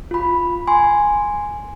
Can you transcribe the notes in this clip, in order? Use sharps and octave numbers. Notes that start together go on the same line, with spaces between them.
F4 B5
G#5 C6